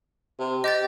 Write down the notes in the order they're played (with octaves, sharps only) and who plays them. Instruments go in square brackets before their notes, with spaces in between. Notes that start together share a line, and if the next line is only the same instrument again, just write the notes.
[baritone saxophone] C3
[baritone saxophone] G4 [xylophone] D#5 A6